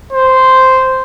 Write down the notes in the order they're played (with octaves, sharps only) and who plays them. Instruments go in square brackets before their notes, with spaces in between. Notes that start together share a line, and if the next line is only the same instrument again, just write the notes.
[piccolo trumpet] C5